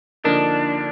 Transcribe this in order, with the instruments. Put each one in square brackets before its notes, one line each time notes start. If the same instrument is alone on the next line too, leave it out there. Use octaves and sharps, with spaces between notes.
[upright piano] D3 F3 A#3 D#4 [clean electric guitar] D4